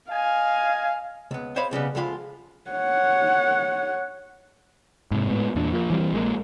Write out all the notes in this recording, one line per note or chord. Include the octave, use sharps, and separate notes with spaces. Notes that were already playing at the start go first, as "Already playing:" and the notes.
D#5 F5 G#5
C#2 B3
C5 C#5 D#5 F5 B5
B1 C#3 G3 B3
D2 F3 G#3 F4 A#5 B5
C#5 F#5
G#2 C3
A2 G#3 B3
E2 A#2 D4
F3 A#3
E3 G3 C4
A#1 G#3 A#3